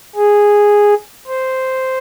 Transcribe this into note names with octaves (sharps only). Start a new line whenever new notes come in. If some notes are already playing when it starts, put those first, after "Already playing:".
G#4
C5